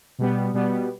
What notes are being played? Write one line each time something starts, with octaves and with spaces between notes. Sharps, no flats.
B2 G3 B3
B2 G3 B3